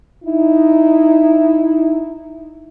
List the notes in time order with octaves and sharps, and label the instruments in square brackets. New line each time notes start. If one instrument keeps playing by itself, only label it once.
[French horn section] D#4 E4